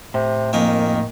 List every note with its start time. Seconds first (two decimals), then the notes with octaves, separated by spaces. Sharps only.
0.14 A2 C3
0.53 F2 D#3 A#3 G#5